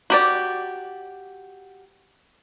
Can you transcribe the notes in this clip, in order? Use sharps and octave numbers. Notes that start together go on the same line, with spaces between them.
F#4 G4 D5